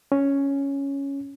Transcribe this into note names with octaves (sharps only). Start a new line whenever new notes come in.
C#4